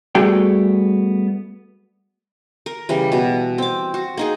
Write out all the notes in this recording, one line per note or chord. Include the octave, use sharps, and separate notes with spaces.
G3 A3 B3 F#4 G#4 G5
A#4
C#3 E3 G3
B2
C4 D6
F#4
A#3 D#4 G#4